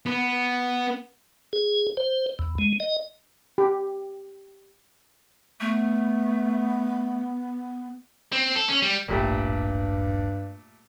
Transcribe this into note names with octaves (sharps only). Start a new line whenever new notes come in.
B3
G#4
C5
E2
G#3
D#5
G4
A3 B3
C4
A4
C#4
G3
D#1 A1 G2 A#2 G3 A3